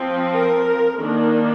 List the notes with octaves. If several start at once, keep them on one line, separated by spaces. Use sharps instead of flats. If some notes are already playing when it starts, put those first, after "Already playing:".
Already playing: F3 C4
A#4
D#3 A#3 D4